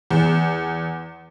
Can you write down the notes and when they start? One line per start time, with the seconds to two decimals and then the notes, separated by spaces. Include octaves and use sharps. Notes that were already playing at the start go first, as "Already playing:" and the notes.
0.11 E2